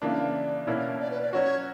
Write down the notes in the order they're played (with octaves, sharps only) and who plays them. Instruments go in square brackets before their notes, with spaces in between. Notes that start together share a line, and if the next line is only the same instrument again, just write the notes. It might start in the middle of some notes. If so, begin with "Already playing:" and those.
[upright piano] C#3 E3 A#3 D4 [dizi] D5
[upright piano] B2 A#3 C#4 E4
[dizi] D5
B4
D5
[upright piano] F#3 C#4 F#4 [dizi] C#5